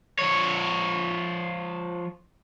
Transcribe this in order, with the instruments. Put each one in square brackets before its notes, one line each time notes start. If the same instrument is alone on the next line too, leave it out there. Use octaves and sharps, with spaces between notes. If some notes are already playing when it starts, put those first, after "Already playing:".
[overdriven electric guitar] F3 C#5